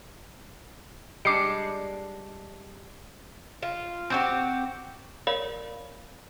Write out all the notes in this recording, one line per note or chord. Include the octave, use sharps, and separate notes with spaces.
G3 G#3 D4 D6 C7 C#7
F4
C4 F#4 G4
A#4 C#5 D5 F5 B5